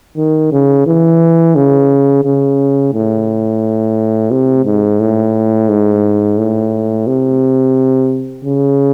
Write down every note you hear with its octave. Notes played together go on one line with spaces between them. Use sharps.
D#3
C#3
E3
C#3
C#3
A2
C3
G#2
A2
G#2
A2
C3
C#3